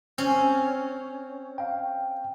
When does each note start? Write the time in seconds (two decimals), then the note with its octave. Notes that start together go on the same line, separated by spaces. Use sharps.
0.18 C4 C#4
1.58 F5 G5